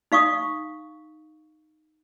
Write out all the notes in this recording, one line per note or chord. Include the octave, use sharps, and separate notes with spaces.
D#4 F5 C#6 D#6